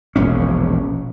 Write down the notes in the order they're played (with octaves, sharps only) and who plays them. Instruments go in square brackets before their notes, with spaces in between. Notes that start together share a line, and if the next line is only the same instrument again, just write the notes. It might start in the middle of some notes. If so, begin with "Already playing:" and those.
[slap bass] E1 A#1 C#4